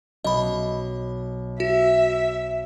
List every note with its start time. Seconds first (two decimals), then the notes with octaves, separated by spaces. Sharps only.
0.24 B1 D#5 B5
1.60 F#4 E5